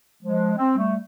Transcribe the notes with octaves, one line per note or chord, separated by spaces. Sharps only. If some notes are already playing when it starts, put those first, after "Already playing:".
F3 G#3
C4
G3 A3